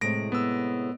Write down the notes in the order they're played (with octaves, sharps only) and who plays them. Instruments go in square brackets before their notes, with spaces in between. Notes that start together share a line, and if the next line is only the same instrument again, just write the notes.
[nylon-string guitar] A2 C3 G#3 [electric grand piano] A#6 D7
[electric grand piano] B3 E6